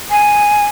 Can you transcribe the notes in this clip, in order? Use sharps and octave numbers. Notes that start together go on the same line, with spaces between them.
G#5